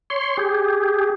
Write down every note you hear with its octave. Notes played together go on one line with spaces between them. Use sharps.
C#5 C6
G4 G#4